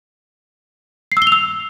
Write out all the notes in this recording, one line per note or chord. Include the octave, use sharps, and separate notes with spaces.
C7
E6
G7
F7
E6